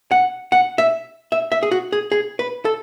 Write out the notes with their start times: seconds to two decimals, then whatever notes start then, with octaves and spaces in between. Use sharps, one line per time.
0.11 F#5
0.52 F#5
0.78 E5
1.32 E5
1.52 E5
1.63 G#4
1.72 F#4
1.92 G#4
2.12 G#4
2.39 B4
2.65 A4